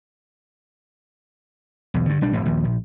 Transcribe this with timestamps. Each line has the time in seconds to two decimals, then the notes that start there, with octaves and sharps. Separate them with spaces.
1.94 B1 E2
2.06 G2 D3
2.21 B1 G3 D4
2.33 E1 A2
2.46 A#1 D#2
2.65 A#1